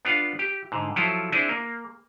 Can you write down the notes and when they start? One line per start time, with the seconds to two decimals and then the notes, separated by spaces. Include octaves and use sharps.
0.05 B3 D4 F4 F5 F#5
0.39 G4
0.72 G#2 D3
0.96 F3 F#3 E4 F4 A4
1.32 C4 D4 E4 G#4
1.49 A#3